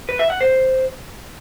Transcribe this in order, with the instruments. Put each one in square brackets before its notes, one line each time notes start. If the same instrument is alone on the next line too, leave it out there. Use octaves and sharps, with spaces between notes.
[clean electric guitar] B4
E5
F#5
C5